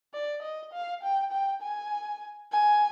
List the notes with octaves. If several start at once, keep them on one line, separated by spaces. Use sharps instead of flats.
D5
D#5
F5
G5
G5
G#5
G#5